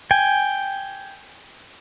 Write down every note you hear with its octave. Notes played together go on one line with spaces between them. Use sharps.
G5 G#5